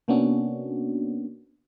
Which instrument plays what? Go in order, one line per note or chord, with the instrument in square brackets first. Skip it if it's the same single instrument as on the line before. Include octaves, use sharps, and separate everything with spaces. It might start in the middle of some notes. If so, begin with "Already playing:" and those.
[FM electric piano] C3 A#3 B3 C#4 D4 F#4